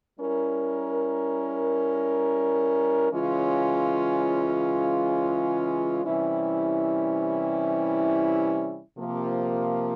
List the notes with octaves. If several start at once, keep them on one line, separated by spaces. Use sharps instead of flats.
G3 C#4 E4 A#4
C#3 E3 G#3 C#4 F4
C3 E3 G3 C#4 E4
C3 F3 A#3